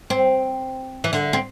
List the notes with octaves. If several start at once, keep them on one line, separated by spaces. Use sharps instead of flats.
C4
E3
D3
C4